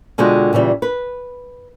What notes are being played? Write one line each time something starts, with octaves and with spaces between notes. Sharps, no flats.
B2 D3 G#3 F4 F#4 G5
A#2 C#3 E3 G3
B4